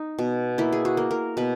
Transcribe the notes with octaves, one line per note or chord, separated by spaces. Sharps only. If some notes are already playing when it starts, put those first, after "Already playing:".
Already playing: D#4
B2
A#3 E4
G#4
F#4
A#3
A#4
B2 B4